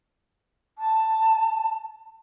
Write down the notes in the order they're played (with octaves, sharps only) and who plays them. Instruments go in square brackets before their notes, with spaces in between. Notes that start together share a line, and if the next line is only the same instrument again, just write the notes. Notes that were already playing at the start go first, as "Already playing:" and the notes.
[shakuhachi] A5